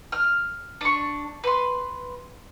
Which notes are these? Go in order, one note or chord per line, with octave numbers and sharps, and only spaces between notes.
F6
D4 C#6
B4 C6